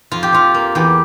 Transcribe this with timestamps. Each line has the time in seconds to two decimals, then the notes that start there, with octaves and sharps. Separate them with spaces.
0.12 F2 F4
0.23 G4
0.33 F3 F4
0.54 A#3
0.75 E2 G4